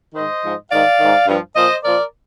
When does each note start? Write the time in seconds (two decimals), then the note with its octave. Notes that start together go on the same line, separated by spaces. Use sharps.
0.15 G#2 D#3 C5 D#5
0.44 G#2 F3
0.71 G#2 D#3 D5 F5
1.00 G#2 D#3
1.27 G2 F3
1.56 A#2 F3 C5 D#5
1.84 A#2 F3 A#4 D5